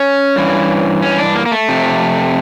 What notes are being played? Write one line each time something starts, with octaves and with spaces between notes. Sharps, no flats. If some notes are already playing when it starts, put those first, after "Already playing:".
Already playing: C#4
G2 E3
C#4
D4
A#3
A#3
A3
F2 C3